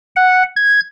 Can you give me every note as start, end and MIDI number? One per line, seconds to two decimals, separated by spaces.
0.16 0.43 78
0.56 0.80 92